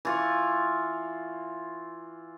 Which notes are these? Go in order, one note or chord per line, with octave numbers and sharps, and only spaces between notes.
E3 F4 C#6